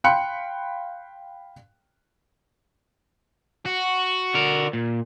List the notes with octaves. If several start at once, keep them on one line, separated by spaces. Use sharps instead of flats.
F5 G5 B5 C6 F#6 C#7
F#4
D3 A#4
A#2